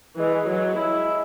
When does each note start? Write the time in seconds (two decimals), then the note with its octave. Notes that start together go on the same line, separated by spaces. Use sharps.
0.19 E3 G#3
0.34 G#3
0.48 F#3 G#3
0.77 E4